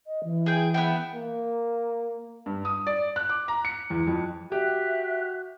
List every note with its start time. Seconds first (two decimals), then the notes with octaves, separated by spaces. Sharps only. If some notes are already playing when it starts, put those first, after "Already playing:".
0.07 D#5
0.24 E3
0.46 G#4 G5
0.74 B3 E5 G5
1.14 A#3
2.46 G2
2.65 D#6
2.87 D5
3.16 F#6
3.29 D6
3.48 A#5
3.65 C#7
3.90 E2
4.07 F2
4.52 F#4 G4 E5 F#6